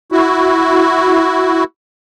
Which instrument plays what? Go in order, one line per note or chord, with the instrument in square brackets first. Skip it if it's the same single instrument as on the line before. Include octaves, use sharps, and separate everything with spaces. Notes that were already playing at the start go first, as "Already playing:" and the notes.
[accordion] E4 F#4